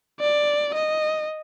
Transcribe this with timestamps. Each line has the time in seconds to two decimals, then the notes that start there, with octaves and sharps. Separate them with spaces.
0.20 D5
0.75 D#5